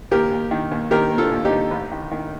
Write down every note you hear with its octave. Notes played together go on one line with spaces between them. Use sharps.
D#2 G4 A#4
D#2
D#3
D#2
D#3 G4 A#4
A#3
F4 A4
D#2
D#4 G4
D#2
A1
D#3
D#3